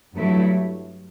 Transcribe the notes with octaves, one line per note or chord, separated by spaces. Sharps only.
G2 F#3 A3 E4